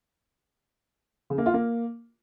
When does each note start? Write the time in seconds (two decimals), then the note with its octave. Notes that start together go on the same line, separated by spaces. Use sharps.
1.30 C#3
1.38 A#3
1.46 F4
1.54 A#3